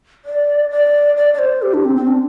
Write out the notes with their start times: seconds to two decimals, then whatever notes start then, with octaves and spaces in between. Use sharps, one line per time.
0.25 D5
0.70 D5
1.17 D5
1.34 D5
1.39 C5
1.62 G4
1.73 D4
1.85 C4
1.96 C4
2.07 D4